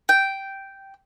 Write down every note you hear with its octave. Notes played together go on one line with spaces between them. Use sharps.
G5